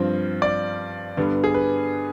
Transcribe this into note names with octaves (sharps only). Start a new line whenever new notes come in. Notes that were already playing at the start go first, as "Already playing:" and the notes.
Already playing: G2 F3 C4
D5
G2 D3 G3 B3
G#4
B4